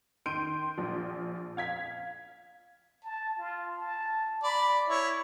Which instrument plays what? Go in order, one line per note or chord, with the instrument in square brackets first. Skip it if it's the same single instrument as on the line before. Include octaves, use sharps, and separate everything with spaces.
[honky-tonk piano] D#3 C6 G6 D7 D#7
A#1 F3
F5 G#6 B6
[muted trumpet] A5
F4
A5
[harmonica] D5 [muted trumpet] B5
[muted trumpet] E4 [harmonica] C#5